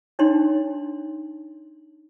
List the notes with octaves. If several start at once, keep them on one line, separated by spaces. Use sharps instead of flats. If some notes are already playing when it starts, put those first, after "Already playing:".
D4 D#4 C#5 C6